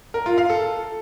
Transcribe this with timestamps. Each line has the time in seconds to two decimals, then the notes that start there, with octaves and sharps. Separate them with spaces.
0.14 A#4
0.26 F4
0.38 F5
0.49 A4